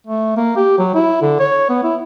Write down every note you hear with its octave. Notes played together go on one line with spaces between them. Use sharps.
A3
A#3
G4
F#3
E4
D3
C#5
B3
E4